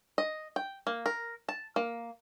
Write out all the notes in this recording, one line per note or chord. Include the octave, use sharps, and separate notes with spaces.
D#5
G5
A#3
A#4
A5
A#3